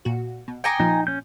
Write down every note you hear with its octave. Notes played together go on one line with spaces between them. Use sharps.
A#2 F#4
B2
G5 G#5 A#5 D6 D#6 C#7
A#2 F3 D#4
C#4 G6